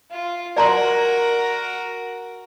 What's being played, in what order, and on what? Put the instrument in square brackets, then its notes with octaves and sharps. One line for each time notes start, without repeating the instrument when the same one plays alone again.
[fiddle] F4
[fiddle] F#4 A#4 [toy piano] D5 A#5 C6